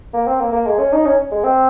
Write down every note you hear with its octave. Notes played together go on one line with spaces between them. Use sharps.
A#3
C4
A#3
A#3
G#3
C#4
D#4
C#4
G#3
C4